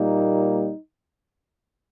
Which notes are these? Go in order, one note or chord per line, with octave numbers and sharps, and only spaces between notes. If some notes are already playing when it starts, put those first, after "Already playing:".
Already playing: A#2 G3 A#3 D#4